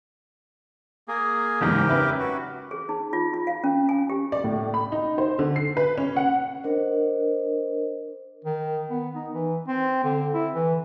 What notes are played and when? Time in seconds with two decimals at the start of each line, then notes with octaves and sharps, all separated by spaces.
1.08 A#3 G#4
1.61 F#1 E2 G#2 G4 A#4
1.89 C#4 B4 E5
2.19 F#4
2.71 G#4
2.89 D#4
3.13 F4
3.34 F4
3.47 F5
3.64 C#4
3.89 G#5
4.10 G4
4.32 D5
4.44 A2
4.74 B5
4.92 D#4
5.18 C5
5.39 D3
5.56 C7
5.77 B4
5.98 C#4
6.16 F#5
6.64 D4 A#4 C5 D#5
8.45 D#3
8.90 B3
9.15 D#4
9.33 E3
9.67 C4
10.04 D3
10.33 E4
10.55 E3